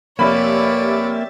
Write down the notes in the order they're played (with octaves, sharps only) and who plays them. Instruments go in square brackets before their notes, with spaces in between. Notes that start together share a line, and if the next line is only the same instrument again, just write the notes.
[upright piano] F1 B5 [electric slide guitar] A#3 [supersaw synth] G4 E5 A6 [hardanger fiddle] C#5 D5